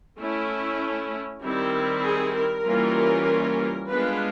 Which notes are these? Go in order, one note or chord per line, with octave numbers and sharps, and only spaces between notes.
A3 C#4 E4
D#3 G3 C4 E4
G#4
A#4
E3 G3 A#3 C#4 F4
G#3 B3 D4 F4 B4